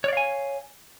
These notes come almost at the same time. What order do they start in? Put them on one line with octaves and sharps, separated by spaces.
C#5 D5 F5 G#5